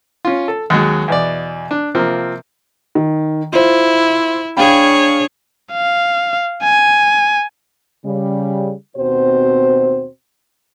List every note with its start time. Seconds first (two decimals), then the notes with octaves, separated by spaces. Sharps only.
0.25 C#4 F4
0.48 A4
0.70 D#2 F#3 G#3
1.08 E2 B2 D5
1.71 D4
1.95 C3 F3 A#3 C4
2.95 D#3
3.53 E4 F4 C5
4.57 D4 G#4 C#5 F5 G5 B5
5.73 F5
6.63 G#5
8.05 C#3 G3
8.97 D#2 B2 C4 F#4 C5